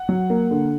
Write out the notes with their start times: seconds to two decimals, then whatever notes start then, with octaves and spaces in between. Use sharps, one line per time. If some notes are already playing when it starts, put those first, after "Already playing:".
Already playing: F#5
0.09 F#3
0.30 A#3
0.51 D3